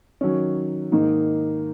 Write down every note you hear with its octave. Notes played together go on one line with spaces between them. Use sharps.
D#3 F#3 C#4
G#2 D#3 A#3 D#4